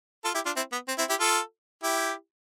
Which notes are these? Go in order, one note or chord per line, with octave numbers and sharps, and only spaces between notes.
F4 A4
E4 G4
D4 F4
C4 E4
B3
C4
C4 E4
E4 G4
F4 A4
E4 G4